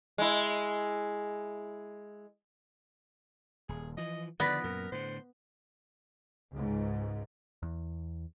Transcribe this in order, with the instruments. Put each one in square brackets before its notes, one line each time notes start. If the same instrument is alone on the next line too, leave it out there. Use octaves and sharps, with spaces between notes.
[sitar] G#3 E4
[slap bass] D#1 [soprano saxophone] G#4
[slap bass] E3 F3 [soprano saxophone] D#5
[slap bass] D3 D#3 F3 [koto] B3 [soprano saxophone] D5 [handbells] F#6 A#6 B6
[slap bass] F#2 A#2 [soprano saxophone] A#4
[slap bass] A2 D3 [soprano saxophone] C5
[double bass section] C#2 G#2
[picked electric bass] E2